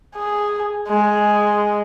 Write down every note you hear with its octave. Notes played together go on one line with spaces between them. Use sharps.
G#4
G#3